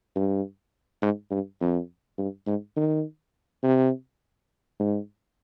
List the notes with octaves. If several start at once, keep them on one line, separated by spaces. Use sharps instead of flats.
G2
G#2
G2
F2
G2
G#2
D#3
C3
G#2